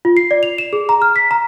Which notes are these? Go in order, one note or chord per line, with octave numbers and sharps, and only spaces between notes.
F4
C7
D5
F7
E7
G#4
A#5
F6
B6
A#5